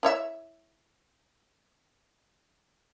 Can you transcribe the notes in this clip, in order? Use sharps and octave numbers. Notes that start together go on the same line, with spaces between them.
E4 C#5 E5